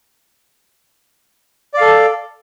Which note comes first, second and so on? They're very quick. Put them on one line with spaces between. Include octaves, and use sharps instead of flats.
D5 F5 A4